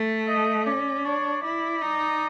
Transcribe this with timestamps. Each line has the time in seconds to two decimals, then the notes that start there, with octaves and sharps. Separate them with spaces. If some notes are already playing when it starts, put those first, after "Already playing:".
Already playing: A3
0.28 D#5
0.66 C#4 D5
1.04 D4 C#5
1.43 E4 D5
1.82 D#4